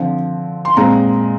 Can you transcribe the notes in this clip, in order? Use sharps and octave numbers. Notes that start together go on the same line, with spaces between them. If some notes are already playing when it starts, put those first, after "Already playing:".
Already playing: D3 F3 C4
C6
A#2 G#3 C4 A#5